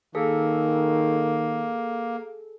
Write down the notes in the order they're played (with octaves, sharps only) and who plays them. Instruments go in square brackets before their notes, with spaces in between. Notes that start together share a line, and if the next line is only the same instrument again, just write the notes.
[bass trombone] D#3 [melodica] A#3 [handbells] G#4 A4